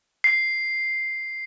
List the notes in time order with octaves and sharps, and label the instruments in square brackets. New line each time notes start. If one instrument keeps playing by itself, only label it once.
[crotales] C7